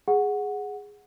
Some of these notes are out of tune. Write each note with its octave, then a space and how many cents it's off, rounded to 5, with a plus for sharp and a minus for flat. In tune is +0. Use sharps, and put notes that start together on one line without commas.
G#4 +0 F#5 -10